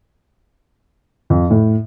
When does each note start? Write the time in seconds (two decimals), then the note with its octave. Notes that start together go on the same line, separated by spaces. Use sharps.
1.30 F2
1.50 A2